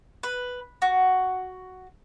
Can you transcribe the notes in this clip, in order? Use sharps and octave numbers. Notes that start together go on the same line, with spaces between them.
B4
F#4